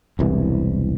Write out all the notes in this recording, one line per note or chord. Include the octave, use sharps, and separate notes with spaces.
E1 C2 E3